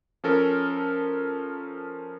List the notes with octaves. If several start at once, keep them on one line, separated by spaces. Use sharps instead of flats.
F3 C#4 A4 A#4